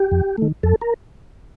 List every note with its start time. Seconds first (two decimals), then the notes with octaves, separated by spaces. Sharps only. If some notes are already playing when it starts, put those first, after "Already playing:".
Already playing: G4
0.12 F2
0.38 D#3 A3
0.63 F2 A4
0.81 A#4